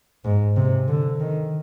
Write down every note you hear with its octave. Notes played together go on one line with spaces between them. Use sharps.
G#2
C3
D3
D#3